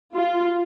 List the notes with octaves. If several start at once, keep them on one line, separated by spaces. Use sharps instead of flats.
F4